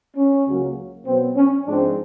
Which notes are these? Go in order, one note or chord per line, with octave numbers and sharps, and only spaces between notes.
C#4
C#2 C#3 F#3 A#3
B2 F#3 B3 C4
C#4
G#2 F3 G#3 C4 D4